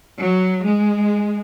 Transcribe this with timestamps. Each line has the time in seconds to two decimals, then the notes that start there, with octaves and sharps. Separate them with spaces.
0.20 F#3
0.65 G#3